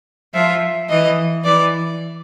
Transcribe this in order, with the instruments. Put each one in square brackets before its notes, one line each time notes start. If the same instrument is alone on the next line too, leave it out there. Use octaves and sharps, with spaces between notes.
[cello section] F3 [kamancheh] E5
[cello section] E3 [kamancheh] D#5
[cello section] E3 [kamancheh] D5